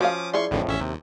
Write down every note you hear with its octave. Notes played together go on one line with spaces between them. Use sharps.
F3 C#4 F#4 F5 D6 D#6
E4 G#4 D5 C6 C#6
G#1 F2 A2 D3 E3
A1 C#4 E5
D#2 C3